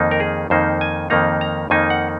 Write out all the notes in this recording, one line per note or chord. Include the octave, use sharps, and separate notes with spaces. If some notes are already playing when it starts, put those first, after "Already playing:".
Already playing: F2 D#3 A#3 D#4
A#4
G#4
F2 D#3 A#3 D#4 C5
G#5
F2 D#3 A#3 D#4 A#5
A#5
F2 D#3 A#3 D#4 G#5
F#5